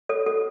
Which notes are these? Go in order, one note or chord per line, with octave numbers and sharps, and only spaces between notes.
A4 C#5
A4